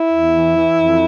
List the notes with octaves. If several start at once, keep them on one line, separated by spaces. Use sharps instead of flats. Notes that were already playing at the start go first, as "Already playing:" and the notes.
Already playing: E4
E2
E3
E3
F2